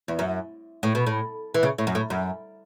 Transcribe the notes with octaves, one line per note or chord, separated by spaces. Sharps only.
E2
F#2
A2
B2
A2
E3
C#3
A2
F#2
A2
F#2